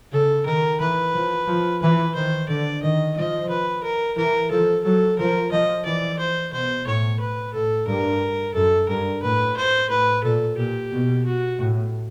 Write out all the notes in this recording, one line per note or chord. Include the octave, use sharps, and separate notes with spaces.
C#3 A4
D#3 A#4
E3 B4
F3
F3
E3 B4
D#3 C5
D3 D5
D#3 D#5
F3 D#5
B4
A#4
E3 A#4
F3 A4
F#3 A4
F3 A#4
F3 D#5
E3 D5
C5
B2 C5
A2 C#5
B4
A2 A4
G2 A#4
F#2 A4
G2 A#4
A2 B4
C5
A2 B4
A#2 A4
A#2 G4
B2
F#4
A2